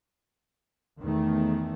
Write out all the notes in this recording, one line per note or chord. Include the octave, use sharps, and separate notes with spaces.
E2 D#3 A3